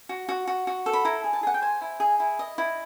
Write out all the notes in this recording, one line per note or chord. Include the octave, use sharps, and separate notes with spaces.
F#4
F#4
F#4
F#4
A4
B5
E4 A#5
G#4
A5
G#4 F#5
G5
C5 G#5
E4
G#4
E4
D#5
E4